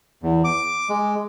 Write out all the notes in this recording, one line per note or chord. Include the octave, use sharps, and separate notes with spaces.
E2
D6
G#3